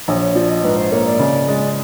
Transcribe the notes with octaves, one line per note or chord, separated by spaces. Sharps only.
A#1 C#5
C#5
F3 D5
D#5
G#2 B4
C5
A#3 C#5
D5
C#3
G#3